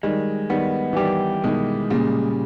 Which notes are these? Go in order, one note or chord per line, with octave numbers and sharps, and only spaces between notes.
D#3 G3 G#3
D#3 G3 B3
E3
D#3 G3 G4
B2 D#3 G#3
A#2 C#3 G3